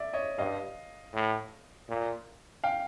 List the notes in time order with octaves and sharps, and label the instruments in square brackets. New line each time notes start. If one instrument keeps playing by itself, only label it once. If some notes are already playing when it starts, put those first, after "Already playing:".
Already playing: [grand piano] D5 E5
C#5 D#5
[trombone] G2 [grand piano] D#5 F5
[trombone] A2
A#2
[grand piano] F5 G5